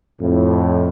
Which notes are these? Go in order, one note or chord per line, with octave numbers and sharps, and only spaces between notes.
F2 A2